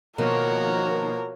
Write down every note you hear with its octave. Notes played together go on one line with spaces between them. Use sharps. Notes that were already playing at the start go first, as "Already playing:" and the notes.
B2 D#3 F3 A#3 F#4 A#4 C#5 A#5